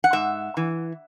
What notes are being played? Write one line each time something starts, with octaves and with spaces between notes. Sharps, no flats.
F#5
G#2 E5
E3